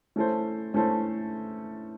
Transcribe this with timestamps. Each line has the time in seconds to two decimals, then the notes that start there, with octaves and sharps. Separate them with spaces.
0.16 A3 C#4 E4 A4 C5
0.74 A3 C#4 E4 A4 C5